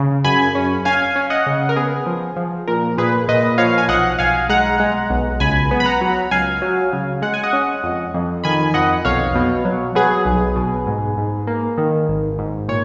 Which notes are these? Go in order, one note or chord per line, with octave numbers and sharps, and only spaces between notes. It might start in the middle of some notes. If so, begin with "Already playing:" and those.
Already playing: C#3
F#2 G#5 B5
C#4
C#4 F5 G#5
C#4
D#5 F#5
C#3
A#4
B3 G#4
F3
F3
A#2 A#4
A#2 G#4 B4
A#2 B4 D#5
F3 C#5 F5
G#5
B1 D#5 F#5
B1 F5 G#5
G#3 F#5 A#5
G#3
B1
C#2 G#5 B5
B3
B5
F#5 A#5
F#3
C#2 F5 G#5
F#3
C#3
G#3 F#5
G#5
D#5 F#5
C#4
F2
F2
D#3 G#5 B5
F2 D#5 F#5
B1 C#5 F5
B2
F#3
F#3 G#4 B4
B1
B2
G#2
G#2
A#3
D#3
G#1
G#2
A#2 C#5